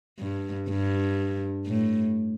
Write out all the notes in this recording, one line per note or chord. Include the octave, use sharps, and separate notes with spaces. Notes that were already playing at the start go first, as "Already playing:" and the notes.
G2
G2
A2